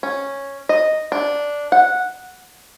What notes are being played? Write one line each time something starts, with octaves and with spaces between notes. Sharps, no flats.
C#4
D#5
D4
F#5